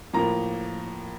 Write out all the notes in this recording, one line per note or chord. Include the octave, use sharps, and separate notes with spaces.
A2 F3 A#3 A#5